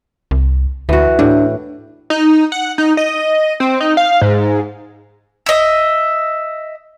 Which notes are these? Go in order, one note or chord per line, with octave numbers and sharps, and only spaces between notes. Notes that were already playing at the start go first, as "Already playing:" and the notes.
C2
D2 E3 F#4
A2 D4
D#4
F#5
D#4
D#5
C4
D#4
F5
G#2
D#5 E5